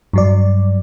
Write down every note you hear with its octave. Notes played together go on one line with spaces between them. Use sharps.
G2 F#3 D5